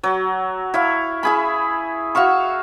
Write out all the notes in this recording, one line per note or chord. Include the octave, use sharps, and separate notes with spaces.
F#3
E4 C#5 F5
E4 G#4 B5
F#4 E5 F5 C#6